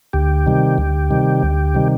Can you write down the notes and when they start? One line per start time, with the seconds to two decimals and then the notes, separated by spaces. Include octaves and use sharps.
0.13 D2 G4
0.46 C3 D#3 G3
0.78 D2
1.10 C3 D#3 G3
1.43 D2
1.74 C3 D#3 G3